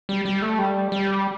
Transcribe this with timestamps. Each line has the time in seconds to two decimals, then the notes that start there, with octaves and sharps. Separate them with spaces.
0.09 G3
0.25 G3
0.42 A3
0.59 G3
0.92 G3